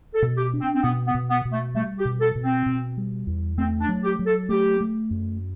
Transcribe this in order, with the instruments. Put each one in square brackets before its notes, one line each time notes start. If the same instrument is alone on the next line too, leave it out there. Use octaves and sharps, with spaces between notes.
[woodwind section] A4
[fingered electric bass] B2
[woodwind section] G4
[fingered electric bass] D4
[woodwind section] C4
C4
[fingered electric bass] B2 [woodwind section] B3
[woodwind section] B3
[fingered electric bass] B2
[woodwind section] B3
[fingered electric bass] B2
[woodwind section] A3
[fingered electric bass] G3 [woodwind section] A3
[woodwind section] G4
[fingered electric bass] B2
[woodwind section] A4
[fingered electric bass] B2
[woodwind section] C4
[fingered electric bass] B2
G3
E2
[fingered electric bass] A3 [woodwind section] C4
[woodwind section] D4
[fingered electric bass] F#3
[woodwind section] G4
[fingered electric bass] F#3
[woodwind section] A4
[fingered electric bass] A3 [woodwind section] G4
[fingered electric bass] A3
F#2